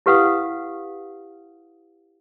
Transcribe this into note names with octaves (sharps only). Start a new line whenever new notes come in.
E4 G4 B4 F5 F#5 D#6